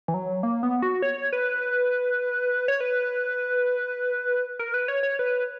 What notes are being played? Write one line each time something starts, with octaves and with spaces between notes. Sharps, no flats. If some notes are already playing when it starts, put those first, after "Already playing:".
E3
F#3
A#3
B3
F#4
C#5
B4
C#5
B4
A#4
B4
C#5
C#5
B4